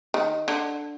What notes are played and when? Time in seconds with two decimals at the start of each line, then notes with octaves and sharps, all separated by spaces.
0.14 D#3
0.48 D3